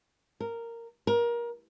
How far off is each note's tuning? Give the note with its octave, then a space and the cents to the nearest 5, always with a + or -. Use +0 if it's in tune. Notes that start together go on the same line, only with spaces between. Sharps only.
A#4 -10
A#4 +25